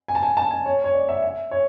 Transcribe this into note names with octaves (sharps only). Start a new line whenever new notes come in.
G#5
A5
G#5
A5
G#5
C#5
C#5
D5
E5
E5
C#5